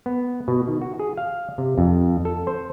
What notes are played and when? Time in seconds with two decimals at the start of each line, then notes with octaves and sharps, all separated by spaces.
0.06 B3
0.48 B2
0.68 D#3
0.82 F#4
1.00 G#4
1.17 F5
1.58 C3
1.78 F2
2.25 A4
2.47 C5